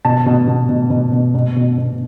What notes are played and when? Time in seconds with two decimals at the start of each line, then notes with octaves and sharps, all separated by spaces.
0.05 B2 A5
0.26 B2
0.47 B2
0.69 B2
0.90 B2
1.12 B2
1.35 B2
1.56 B2
1.78 B2